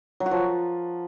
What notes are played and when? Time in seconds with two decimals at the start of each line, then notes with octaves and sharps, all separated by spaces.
0.20 F#3
0.26 F#4
0.31 F3